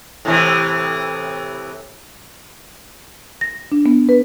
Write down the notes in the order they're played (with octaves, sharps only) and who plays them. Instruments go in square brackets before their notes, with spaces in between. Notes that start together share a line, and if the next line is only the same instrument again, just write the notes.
[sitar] A2 C3 E3
[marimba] A#6
D4
B3
B4